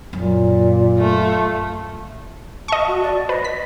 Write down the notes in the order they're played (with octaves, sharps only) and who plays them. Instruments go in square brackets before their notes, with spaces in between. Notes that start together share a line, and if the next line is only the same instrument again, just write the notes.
[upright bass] F#2 [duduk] A#2
[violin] A3 F4
[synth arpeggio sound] D#5 C#6 [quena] A5
[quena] F#4
D5
[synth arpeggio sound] B4 [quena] D#5
[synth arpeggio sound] B6